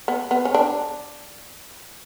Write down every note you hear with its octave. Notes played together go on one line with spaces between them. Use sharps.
B3
B3
C#4
D4